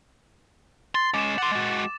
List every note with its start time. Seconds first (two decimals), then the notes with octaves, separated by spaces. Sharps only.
0.95 C6 A6
1.14 G#3 C#4 D6 E7
1.38 F#5 C6
1.51 G#3 F#4